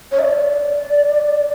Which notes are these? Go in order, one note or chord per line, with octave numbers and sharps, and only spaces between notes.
C#5
E5
D5